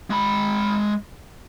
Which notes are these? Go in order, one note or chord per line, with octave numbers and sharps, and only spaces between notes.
G#3 B5